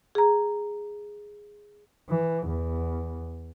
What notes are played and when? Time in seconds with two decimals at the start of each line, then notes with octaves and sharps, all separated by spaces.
0.15 G#4 A#5
2.09 E3
2.47 E2